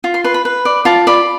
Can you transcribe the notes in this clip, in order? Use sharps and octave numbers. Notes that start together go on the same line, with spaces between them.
F4
C6
B4 C6
B5
B4
D5
F4 A5
D5 B5